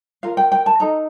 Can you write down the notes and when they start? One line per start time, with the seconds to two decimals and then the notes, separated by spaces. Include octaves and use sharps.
0.23 F4 A#4 F5
0.37 G5
0.52 G5
0.66 A5
0.80 D#4 A4 A#5